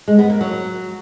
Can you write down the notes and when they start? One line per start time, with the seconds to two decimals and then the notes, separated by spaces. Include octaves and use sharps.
0.08 G#3
0.19 B3
0.30 A#3
0.41 F#3